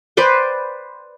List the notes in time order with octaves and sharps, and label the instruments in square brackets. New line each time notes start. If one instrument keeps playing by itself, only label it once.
[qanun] B4 C5 D5 G5